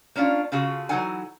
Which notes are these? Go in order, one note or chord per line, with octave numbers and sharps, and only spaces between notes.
A#3 C#4 D4 F4
C#3 F4 F#4 G#4 A4
E3 F#3 D#4 A4 F#5 G#5